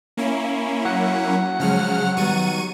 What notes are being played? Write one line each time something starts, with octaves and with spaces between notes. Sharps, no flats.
A#3 C#4 E4
F#3 F#5
C#3 F3 G#3 F6
D#3 G3 B3 C#6 D#7